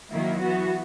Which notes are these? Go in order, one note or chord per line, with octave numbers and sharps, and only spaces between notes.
D#3 F#3 A#3 E4
E3 B3 F#4